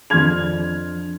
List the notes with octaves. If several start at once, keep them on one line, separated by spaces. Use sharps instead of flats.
F2 D4 C6 F6 G#6 F7